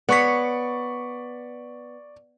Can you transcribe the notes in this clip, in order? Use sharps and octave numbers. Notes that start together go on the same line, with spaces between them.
B3 C#5 D5 C#6 B6